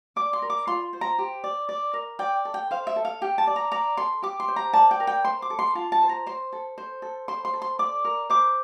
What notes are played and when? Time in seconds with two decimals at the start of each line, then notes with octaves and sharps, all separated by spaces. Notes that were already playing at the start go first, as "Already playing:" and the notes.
0.16 D5 D6
0.33 C6
0.42 A#4
0.50 D6
0.67 F4 C6
0.93 C5
1.01 A#5
1.18 G4
1.44 D5
1.69 D5
1.94 A#4
2.19 D5 G5
2.45 A4
2.54 G5
2.71 C5 F5
2.87 E5
2.96 A4
3.05 F5
3.22 G4 G5
3.38 A5
3.47 D5
3.56 A#5
3.72 D5 A#5
3.97 A4 C6
4.22 G4 D6
4.40 C6
4.48 C5
4.56 A#5
4.73 D5 A5
4.91 G5
5.00 A#4
5.07 G5
5.25 C5 C6
5.42 D6
5.50 A4
5.59 C6
5.75 F4 A5
5.92 A5
6.02 C5
6.09 A#5
6.27 C5 C6
6.53 A4
6.78 C5
7.02 A4
7.28 C5 C6
7.45 C6
7.54 A4
7.62 C6
7.79 D5 D6
8.05 A#4
8.30 C5 D6